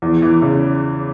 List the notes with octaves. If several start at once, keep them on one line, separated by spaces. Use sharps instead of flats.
E2
E3
C#3